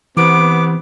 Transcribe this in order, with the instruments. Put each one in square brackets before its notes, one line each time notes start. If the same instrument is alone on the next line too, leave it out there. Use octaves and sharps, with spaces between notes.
[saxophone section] C3 B3 [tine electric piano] E3 [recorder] D6